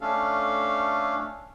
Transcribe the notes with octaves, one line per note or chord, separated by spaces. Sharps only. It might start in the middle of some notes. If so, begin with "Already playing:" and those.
A3 C#4 D4 A4 F5